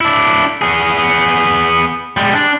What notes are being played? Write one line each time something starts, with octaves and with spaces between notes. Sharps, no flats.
D4 E4
B3 G#4
G3 G#3
D4